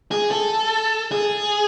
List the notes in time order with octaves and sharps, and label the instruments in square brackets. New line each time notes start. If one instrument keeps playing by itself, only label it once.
[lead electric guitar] G#4
A4
G#4